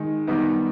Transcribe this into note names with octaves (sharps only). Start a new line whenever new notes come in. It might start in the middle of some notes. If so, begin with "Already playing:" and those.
Already playing: D#3 G#3 D#4
D#3 G3 B3 D#4